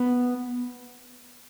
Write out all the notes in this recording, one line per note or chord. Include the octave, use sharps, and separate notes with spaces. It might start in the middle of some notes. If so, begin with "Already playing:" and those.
Already playing: B3